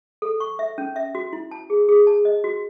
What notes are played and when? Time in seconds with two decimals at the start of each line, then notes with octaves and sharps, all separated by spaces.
0.22 A4
0.40 C#6
0.59 E5
0.78 C#4
0.96 E5
1.15 F#4
1.33 E4
1.51 A5
1.70 G#4
1.89 G#4
2.07 A5
2.25 D#5
2.44 F#4